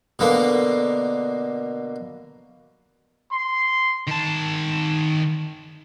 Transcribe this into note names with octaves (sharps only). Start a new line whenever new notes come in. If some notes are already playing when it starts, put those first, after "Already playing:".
B2 D3 A#3
C6
D#3 A5